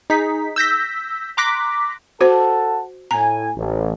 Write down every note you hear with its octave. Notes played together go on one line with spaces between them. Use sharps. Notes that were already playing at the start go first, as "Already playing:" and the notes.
D#4 G#4 B6
E6 G6 A#6 B6
A#5 C6 D6 F#6 A#6 B6
F#4 A4 C5 F#5 A5
A2 G#5 A#5
A1